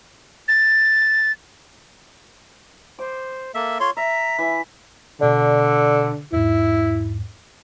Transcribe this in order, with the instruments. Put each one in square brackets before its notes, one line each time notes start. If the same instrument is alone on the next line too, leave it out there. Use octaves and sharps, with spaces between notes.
[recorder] A6
[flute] C5 [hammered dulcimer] D6
[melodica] A#3 E5 [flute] A4
[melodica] F4 C#5 C6
[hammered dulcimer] E5 [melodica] A#5 [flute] B6
[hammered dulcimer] E3 E5
[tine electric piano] B2 D5 [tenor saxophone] D3
[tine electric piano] E2 G#2 [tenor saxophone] E4